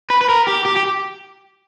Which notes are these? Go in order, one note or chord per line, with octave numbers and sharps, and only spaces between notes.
B4
B4
A#4
G4
G4
G4